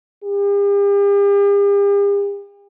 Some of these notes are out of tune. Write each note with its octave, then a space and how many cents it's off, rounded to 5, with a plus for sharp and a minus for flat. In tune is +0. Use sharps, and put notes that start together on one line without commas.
G4 +45